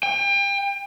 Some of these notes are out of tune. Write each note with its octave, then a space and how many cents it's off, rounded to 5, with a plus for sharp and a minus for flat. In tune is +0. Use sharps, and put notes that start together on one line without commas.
G5 +35